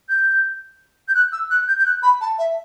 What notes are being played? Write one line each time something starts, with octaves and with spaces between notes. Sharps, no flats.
G6
G6
F#6
E6
F#6
G6
G6
F#6
B5
A5
E5